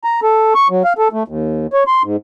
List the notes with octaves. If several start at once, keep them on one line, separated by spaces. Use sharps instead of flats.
A#5
A4
C#6
F#3
F5
A4
A3
D#2
C#5
C6
G#2